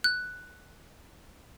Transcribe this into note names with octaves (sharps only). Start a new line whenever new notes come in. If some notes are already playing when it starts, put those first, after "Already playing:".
F#6